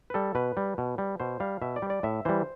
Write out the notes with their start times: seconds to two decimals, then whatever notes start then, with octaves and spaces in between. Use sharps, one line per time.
0.10 B4
0.14 G3 A4
0.35 B2 B4
0.57 G3
0.78 B2
0.98 G3
1.20 B2 C5
1.40 G3 F5
1.62 B2 E5
1.76 D5
1.82 G3
1.90 D5
2.03 A2 E5
2.25 E3 G3 C5